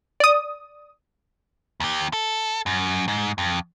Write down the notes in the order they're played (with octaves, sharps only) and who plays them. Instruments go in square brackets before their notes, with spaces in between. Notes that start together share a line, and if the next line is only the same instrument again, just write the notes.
[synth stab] D5 D#6
[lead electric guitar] D#2 G4
A4
F#2
G#2
F2